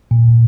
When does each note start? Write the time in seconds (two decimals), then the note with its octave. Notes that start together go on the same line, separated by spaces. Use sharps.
0.11 A#2